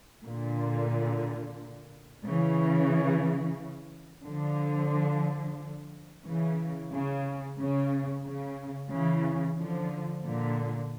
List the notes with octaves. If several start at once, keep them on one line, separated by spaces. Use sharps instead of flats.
A#2 D3
C#3 E3
D3 F3
C#3 E3
C#3
C#3
C#3
C#3 E3
D3 F3
A#2 D3